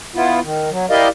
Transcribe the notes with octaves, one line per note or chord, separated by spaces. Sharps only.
B3 E4 F4
D#3
F#3
E4 G4 A#4 D5 D#5 F5